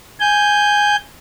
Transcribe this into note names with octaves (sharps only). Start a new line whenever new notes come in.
G#5 G6